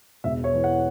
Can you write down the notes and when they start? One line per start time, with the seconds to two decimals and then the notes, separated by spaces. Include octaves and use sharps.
0.24 E1 E5
0.44 C#5
0.54 E3
0.64 F#5